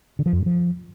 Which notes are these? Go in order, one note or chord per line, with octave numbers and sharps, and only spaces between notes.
D3
F3
F2
G2
F3